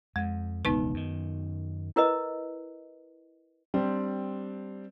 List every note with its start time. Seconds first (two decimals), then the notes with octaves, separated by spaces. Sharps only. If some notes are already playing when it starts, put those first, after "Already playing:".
0.16 F2 G#3
0.65 E1 C#2 D#3 B3 D#4 B4
0.94 F#2 D#3
1.96 E4 A#4 B4 D#5
3.74 G3 C4 D4